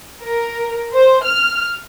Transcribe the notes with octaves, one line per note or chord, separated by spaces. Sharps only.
A#4
C5
F6